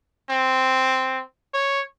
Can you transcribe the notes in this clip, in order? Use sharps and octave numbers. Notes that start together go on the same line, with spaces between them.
C4
C#5